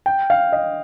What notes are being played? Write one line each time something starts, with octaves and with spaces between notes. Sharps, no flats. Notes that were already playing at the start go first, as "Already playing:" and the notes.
G5
F5
D#5